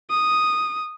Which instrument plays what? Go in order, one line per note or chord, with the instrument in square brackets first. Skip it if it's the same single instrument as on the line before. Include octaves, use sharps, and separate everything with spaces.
[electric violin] D#6